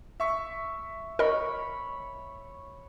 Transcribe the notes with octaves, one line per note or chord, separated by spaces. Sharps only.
E5 C#6
A#4 C#5 D#5 B5